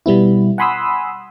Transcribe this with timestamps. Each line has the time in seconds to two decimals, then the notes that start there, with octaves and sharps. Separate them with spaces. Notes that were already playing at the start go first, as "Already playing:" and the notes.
0.06 B2 G3 B3 E4
0.58 F#5 G#5 B5 C6 D#6 E6